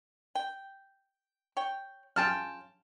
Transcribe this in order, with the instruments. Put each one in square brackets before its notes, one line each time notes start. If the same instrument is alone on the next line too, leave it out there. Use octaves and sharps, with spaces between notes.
[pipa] G5
C#5 G5
[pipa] C#4 F4 G#4 [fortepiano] G5 A5 F6